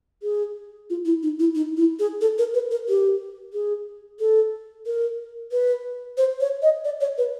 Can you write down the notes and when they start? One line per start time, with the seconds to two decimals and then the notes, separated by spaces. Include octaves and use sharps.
0.23 G#4
0.90 F4
1.05 E4
1.23 D#4
1.40 E4
1.55 D#4
1.77 E4
1.99 G#4
2.21 A4
2.38 A#4
2.54 B4
2.71 A#4
2.88 G4
3.53 G#4
4.20 A4
4.86 A#4
5.52 B4
6.17 C5
6.40 C#5
6.62 D#5
6.85 D5
7.01 C#5
7.18 B4